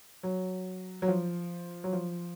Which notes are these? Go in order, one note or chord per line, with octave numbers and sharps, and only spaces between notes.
F#3
F#3
F3
F#3
F3